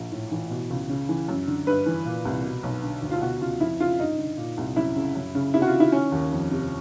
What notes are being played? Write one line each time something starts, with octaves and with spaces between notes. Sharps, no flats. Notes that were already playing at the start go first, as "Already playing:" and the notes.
Already playing: A#1
A2
E3
B2
C#2
C#3
E3
F#2
D3
G2 B4
E3
A#2
C2
B2
B1
D3
D2
F4
B2 F#4
C#2 F4
F2 E4
C#3 F4
G2 D#4
D3
A#2
C2
F#2 E4
C#3
F#2
C#3
C3 E4
F#4
F4
D#3
E4
D#3 C#4
D#2
F2
C3